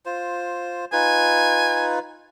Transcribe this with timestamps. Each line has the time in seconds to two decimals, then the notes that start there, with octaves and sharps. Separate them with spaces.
0.06 F4 C5
0.92 D#4 F4 B4 G#5